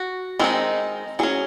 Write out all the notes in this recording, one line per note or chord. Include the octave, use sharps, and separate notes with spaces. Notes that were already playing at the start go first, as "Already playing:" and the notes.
Already playing: F#4
D#3 G#3 C4 D#4
F#3 C#4 G#4